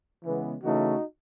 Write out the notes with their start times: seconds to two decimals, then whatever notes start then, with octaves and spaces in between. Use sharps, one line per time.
0.25 C#3 E3 G#3 B3
0.63 C#3 E3 A3 D#4 F#4